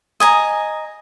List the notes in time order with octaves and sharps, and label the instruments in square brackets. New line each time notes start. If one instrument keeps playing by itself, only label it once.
[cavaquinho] D#5 G#5 A#5